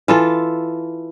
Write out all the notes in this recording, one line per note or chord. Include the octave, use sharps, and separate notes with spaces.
E3 F4 A4